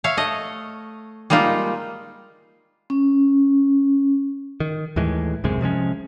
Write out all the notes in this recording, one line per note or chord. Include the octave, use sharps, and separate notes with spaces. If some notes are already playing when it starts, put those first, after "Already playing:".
C#5 E5 F5
A3 D#5
G3 G#3 A#3 D#4 F4
C#4
D#3
D#2 A2 E3 G#3
B1 F#2 C3 G#3
C3 F3 G#3 C#4